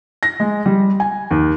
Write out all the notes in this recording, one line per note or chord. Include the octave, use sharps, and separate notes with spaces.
A#6
G#3
G3
G#5
D#2